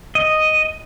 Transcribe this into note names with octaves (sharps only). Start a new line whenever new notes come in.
D#5